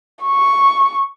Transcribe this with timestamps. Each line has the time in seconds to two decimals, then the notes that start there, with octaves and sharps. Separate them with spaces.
0.25 C#6